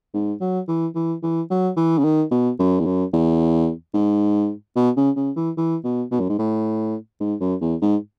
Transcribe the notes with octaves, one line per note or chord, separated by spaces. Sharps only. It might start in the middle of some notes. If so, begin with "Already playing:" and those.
G#2
F#3
E3
E3
E3
F#3
E3
C#3
D#3
B2
F#2
E2
F#2
E2
G#2
B2
C#3
C#3
E3
E3
B2
B2
F#2
G#2
A2
G#2
F#2
E2
G#2